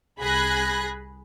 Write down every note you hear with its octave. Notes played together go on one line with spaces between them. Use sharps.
C2 G#4 B5 F#6 G#6 A#6